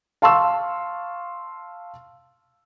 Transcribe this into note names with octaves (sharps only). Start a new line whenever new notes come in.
F5 A5 C6 C#6 E6